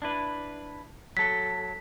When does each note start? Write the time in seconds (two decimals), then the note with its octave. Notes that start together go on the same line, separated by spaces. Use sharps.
0.02 D4 E4 B4
1.17 F#3 A4 B6